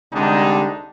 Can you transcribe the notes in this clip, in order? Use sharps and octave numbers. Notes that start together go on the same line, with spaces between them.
C2 D3 G#3 D4 D#4 G4